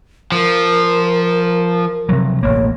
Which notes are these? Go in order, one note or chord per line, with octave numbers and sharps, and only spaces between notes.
F3 A#4
C3 F3 F#3
E1 A1 A#3 C#5